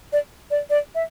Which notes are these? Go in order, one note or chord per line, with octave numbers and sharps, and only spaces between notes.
D5
D5
D5
E5